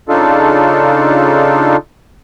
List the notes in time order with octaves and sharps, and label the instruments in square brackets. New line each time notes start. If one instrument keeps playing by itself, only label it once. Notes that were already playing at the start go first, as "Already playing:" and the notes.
[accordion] C#3 D4 D#4 F4 A4